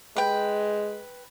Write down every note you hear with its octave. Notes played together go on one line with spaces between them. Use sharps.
G#3 B4 G5